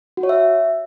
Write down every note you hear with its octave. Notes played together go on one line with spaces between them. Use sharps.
F#4
C#5
E5